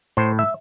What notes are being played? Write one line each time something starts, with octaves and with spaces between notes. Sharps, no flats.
A2 C5
E5